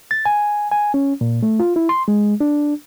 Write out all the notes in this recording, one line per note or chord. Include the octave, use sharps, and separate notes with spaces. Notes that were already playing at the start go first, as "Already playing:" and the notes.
A6
G#5
G#5
C#4
A#2
A3
F4
E4
C6
G#3
D4